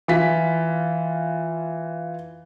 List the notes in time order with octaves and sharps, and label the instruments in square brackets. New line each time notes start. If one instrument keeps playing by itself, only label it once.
[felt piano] E3 F4 B6